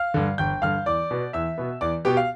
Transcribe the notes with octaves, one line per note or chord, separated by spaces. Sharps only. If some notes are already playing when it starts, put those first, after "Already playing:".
Already playing: F5 F6
G2 D3
G1 G5 G6
G2 D3 F5 F6
E2 D5 D6
B2 B3
E2 E5 E6
B2 B3
E2 D5 D6
B2 B3 G4 G5
F5